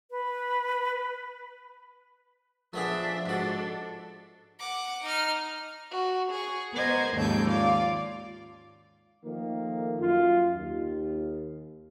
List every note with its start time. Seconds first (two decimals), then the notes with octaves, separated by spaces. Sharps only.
0.11 B4
2.74 F3 A3 B3 D4 G#4 E5
3.26 G#2 D4 F#4 A4
4.59 F#5 D6
5.02 D#4 F6
5.91 F#4
6.30 G#4 C#6
6.73 B3 A#4 C5 D#5 G#6
7.14 D#2 G#2 C#3 F3 A4 G6
7.48 F4 D5 F5
9.24 D#3 F3 A3 A#3
10.00 F#2 F4
10.56 D#2